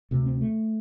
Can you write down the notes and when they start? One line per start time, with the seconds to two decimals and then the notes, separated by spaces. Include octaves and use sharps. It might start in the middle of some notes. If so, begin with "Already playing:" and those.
0.11 D2 C3 C4
0.26 C4
0.41 A3